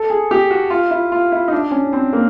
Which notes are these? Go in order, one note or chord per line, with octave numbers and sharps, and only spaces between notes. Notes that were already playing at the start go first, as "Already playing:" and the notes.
Already playing: A4
G#4
G4
F#4
F4
E4
F4
E4
D#4
D4
C#4
C4
A#3